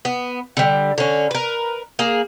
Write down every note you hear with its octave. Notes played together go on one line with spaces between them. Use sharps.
B3
D3 G3
D3 C#4
A#4 B4
A#3 G#4